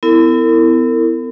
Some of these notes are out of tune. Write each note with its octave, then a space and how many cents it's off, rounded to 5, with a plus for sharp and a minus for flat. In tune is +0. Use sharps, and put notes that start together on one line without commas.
B3 +40 E4 +0 A#4 -45